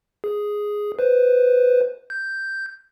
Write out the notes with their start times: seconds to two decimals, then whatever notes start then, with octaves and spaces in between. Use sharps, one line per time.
0.24 G#4
0.99 B4 C5
2.10 G6